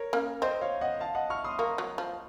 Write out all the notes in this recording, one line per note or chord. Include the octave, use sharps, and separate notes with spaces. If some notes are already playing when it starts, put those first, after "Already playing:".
Already playing: A#4 C#5
A#3 C#4
C4 C5 D#5
C#5 F5
D#5 F#5
F5 A5
D#5 F#5
C#6 F6
C6 D#6
A#3 A#5 C#6
F#3
F3